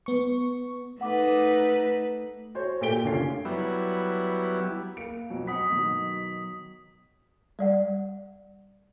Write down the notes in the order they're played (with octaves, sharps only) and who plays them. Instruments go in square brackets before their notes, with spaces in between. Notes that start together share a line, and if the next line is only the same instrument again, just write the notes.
[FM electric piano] B3 C#6
[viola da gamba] A3 D#4 B4 [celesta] F#5 D6
[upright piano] F#4 C5 C#5
A#2 A3 G4 D7 G7
F#1 D3 C#4 F4 C7
[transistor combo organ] F#3 G3 B3 E4
[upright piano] A#3 F5 D7
F2 B2 F#3
[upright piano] D#5 F#5 B5 [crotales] D#6 B6
[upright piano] B2 D#3 F#3
[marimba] G3 D5 F#5